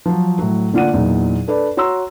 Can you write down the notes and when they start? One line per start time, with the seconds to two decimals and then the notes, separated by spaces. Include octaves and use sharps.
0.06 F3 F#3
0.39 A2 F#3
0.73 D3 A#3 F4 D5 F#5 D#7
0.93 E2 A#2 F#3 D#4 E4
1.48 D4 A4 B4 D5
1.77 F#4 C#5 A#5 C6 E6